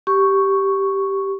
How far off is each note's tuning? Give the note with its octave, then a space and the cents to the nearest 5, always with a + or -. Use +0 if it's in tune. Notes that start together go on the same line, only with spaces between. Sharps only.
G4 -5 C#6 +0